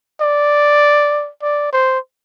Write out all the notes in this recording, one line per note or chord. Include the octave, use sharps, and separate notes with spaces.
D5
D5
C5